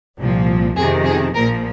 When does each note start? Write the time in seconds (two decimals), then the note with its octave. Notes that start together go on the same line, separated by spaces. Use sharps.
0.19 C2 A#2 F3
0.76 F2 C3 D#3 G#4
1.05 G#4
1.35 A#1 A#2 F3 A#4